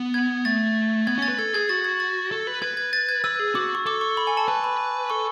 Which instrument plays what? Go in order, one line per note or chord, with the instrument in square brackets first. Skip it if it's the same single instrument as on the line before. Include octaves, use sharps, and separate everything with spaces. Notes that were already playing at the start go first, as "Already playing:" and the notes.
Already playing: [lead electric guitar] B3
[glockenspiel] G#6
[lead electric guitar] A3 [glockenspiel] A6
[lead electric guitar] B3 [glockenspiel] G#6
[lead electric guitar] C#4 [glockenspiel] A6
[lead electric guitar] B4
[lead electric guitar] A4 [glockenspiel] G#6
[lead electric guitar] G#4 [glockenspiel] G#6
[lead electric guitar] F#4 [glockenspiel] A6
[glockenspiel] G#6
A6
[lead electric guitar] A4
B4
[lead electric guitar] B4 [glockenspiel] G#6
[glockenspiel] G#6
A6
G#6
[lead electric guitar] B4 [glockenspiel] E6
[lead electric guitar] G#4
[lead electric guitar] F#4 [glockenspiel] D6
[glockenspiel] C#6
[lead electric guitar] A4 [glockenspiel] D6
[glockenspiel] C#6
B5
G#5
A5
[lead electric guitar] B4 [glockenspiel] A5
[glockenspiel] B5
[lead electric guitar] A4 [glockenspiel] C#6